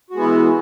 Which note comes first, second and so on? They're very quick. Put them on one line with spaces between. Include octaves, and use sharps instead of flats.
F#4 G#3 B3 E4 E3